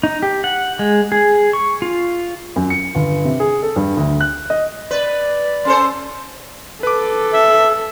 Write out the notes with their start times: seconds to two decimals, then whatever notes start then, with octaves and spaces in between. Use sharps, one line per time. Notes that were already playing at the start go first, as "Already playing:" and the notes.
0.03 D#4
0.23 G4
0.44 F#5
0.79 G#3
1.12 G#4
1.53 C#6
1.82 F4
2.56 F#2
2.70 C#7
2.95 G1
3.25 C3
3.40 G#4
3.63 A4
3.76 G2
3.97 D2
4.21 F#6
4.50 D#5
4.91 B4 D5
5.65 C#4 A4 C5 C6
6.83 A4 B4 D6
7.33 E5